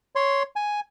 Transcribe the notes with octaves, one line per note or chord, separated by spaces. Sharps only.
C#5 C6
G#5